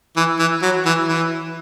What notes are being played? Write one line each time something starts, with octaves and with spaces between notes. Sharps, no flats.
E3
E3
F#3
E3
E3